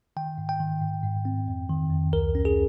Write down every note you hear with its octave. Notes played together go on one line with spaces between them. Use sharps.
D#3 G5
G#2
G5
D#3
G#2
G#2
C4
F2
D#3
F2
C#2 A#4
C#4
G#4